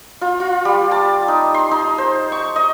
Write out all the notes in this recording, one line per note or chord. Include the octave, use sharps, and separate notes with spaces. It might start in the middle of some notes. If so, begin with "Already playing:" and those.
F4
F4
G3
A5
D#4
C6
D#4
C5
C#6
D#5